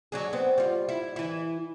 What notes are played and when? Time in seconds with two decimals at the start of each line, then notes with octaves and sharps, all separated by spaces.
0.12 F#3 D4 G#4
0.33 B3 C4
0.58 G3 F4
0.89 E4
1.16 E3 E4